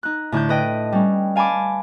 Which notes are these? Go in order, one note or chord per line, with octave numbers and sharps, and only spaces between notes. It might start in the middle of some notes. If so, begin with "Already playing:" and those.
D#4 F#6
A2 D3 E4 A5 G6
B4 D#5 G5
G3 C#4
F5 G#5 A5 B5 D6